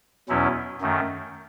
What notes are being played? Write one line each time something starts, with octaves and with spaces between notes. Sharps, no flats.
E2 B2 F#3 C#4 E4
F#2 D#3 A3